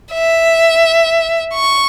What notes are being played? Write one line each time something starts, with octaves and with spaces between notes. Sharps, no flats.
E5
C#6